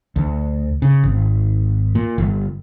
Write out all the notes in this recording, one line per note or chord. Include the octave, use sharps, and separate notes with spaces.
D2
C#3
G#1
A#2
G1